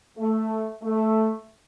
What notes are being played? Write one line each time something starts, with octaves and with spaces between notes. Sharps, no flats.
A3
A3